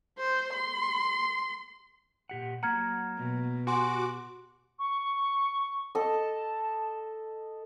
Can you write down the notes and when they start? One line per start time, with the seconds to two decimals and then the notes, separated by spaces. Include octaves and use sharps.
0.19 C5
0.54 C6
2.29 A#2 G4 F#5
2.63 F#3 A#3 F#5 A#5 F6 G#6
3.17 B2
3.67 F#4 G4 G#5 C6 D6
4.79 C#6
5.95 A4 D#5 A5